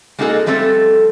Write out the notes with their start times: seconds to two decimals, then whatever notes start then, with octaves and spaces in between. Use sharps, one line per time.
0.19 G#3 A#3 D#4 F#4 G#4 A4
0.46 F3 G3 A3 C4 A4